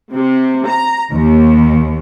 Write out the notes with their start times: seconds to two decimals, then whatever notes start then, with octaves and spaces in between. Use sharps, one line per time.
0.14 C3
0.68 A#5
1.12 D#2